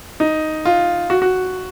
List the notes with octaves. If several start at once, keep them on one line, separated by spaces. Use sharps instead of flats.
D#4
F4
F#4
F#4